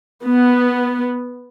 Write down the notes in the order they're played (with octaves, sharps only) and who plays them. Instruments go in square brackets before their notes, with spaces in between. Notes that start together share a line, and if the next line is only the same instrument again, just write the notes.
[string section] B3